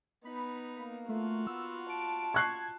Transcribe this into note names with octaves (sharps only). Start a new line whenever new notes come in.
B3 D#4 B5
A#3
A3 F4 F#4
B3 E6
A5 D7
C#6 F#6 G#6 C7